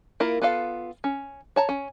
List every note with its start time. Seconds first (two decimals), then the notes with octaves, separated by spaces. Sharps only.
0.20 A#3 E4 F4 A#4
0.42 B3 F4 A4 F5
1.04 C#4
1.56 C#5 A5 A#5
1.69 C#4